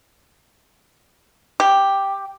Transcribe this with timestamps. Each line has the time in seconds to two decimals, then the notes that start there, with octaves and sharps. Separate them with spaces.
1.60 G4